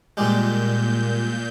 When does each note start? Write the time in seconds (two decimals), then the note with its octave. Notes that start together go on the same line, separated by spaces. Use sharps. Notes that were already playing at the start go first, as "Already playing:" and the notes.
0.17 A#2 G3 G#3 G6